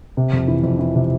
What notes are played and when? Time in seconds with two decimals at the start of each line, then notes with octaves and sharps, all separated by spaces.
0.17 C3
0.33 F2
0.48 E3
0.64 F2
0.79 E3
0.95 C3